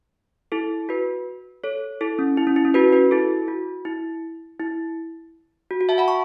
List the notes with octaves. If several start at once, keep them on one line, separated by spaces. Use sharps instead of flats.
E4 A4
F#4 B4
A4 C#5
E4 A4
C#4
E4
C#4
E4
C#4
F#4 B4
F#4 B4
E4 A4
F#4
E4
E4
F#4
F#4
E5 A5
F#5 B5
A5 C#6